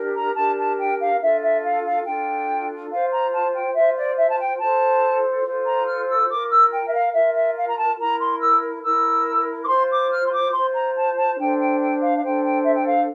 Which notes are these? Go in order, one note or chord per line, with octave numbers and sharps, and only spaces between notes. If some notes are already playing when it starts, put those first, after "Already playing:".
Already playing: D4 G4 A#4
A#5
D4 G4 A#4 A5
A5
G5
F5
D4 F4 A4 E5
E5
F5
F5
D4 F4 A4 G5
F4 C5 F5
A#5
A5
G5
F4 C5 E5
D5
E5
A5
G5
F4 A4 C5 A5
F4 A4 C5
A#5
F6
E6
F4 A#4 D6
E6
G5
E5
F5
F4 A#4 E5
E5
F5
A#5
A5
E4 A#4 A#5
C6
E6
E4 A#4 E6
D6
F4 C5 C6
D6
F6
C6
D6
F4 C5 C6
A#5
A5
A5
D4 A4 C5 G5
G5
G5
F5
F5
D4 A4 C5 G5
G5
E5
G5
F5